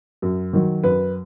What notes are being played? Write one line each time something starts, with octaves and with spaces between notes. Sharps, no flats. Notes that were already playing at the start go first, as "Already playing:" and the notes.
F#2
D#3 F#3
F#2 B4